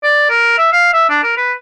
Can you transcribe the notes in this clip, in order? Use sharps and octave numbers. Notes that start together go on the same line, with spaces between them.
D5
A#4
E5
F5
E5
D4
A#4
B4